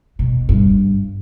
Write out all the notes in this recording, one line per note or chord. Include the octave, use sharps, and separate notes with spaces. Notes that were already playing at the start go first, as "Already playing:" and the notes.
B2
G2